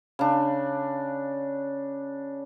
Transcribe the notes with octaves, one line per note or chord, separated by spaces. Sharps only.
C#3 D4